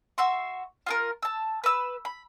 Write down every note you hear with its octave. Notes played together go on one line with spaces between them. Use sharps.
F#4 E5 C6
F4 G#4 A#4
A5 E6
B4 E6
B5